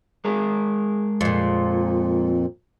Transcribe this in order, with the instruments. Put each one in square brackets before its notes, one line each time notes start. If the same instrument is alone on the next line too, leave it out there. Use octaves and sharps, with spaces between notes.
[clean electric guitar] G#3 G#4 A#4
[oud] F2 A#2